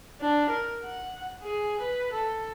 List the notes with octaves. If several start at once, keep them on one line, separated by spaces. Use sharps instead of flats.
D4
A#4
F#5
G#4
B4
A4